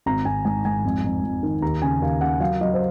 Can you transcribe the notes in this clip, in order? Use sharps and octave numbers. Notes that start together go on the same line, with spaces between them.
G#1 A#5
G#1 G#5
G#2 G#5
G#2 G#5
F2
F2
F2
D#3
D#2 A#5
C#3 G#5
D#2 F5
C#3 F#5
F#3 F5
F#3 D#5
C5